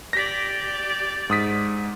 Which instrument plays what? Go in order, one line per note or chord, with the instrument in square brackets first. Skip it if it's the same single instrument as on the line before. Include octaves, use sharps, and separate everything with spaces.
[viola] G4 D5 [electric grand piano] A#6 B6
[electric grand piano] G#2 D#6 B6